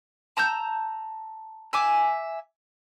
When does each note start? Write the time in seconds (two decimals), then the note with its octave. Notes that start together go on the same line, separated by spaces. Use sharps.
0.37 A5 A#5 E6 G6
1.73 E5 G#5 D6